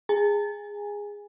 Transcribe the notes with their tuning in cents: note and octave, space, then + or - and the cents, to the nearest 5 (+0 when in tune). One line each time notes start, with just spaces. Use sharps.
G#4 -10 G#5 -15